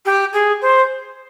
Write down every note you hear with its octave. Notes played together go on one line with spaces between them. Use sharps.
G4
G#4
C5